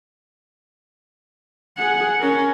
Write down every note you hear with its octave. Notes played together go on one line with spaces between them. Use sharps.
G#4 F#5
C#4 A#4